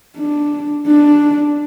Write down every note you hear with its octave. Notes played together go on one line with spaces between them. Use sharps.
D4
D4